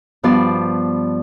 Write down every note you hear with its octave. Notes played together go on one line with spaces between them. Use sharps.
G2 F3 B3 B4 D5